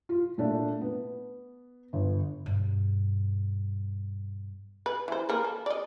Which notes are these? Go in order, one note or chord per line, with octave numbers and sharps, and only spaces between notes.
F4
A#2 A3 D4
B3
G1
G2 B2
B4
E3 C5
A#3 A#4 B4
A4
D5 D#5